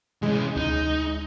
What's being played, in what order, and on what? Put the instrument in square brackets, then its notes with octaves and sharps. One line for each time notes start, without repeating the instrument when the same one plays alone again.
[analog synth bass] C3 [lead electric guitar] E3 C#4 [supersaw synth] G#3
[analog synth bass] D2 [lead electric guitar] D#4